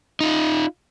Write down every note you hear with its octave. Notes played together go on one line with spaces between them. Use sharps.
D#4 F4